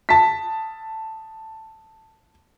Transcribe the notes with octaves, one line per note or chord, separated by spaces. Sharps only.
A5 B6